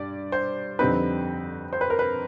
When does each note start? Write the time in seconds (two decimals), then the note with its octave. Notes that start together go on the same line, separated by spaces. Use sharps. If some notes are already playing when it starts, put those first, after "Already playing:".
Already playing: G2 D5
0.32 C5
0.79 F2 D3 G3 C4 D#4 B4
1.73 C5
1.81 B4
1.90 A#4
1.99 B4